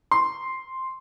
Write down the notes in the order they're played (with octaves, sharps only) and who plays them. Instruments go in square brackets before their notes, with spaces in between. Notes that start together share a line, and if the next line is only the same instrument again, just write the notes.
[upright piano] C6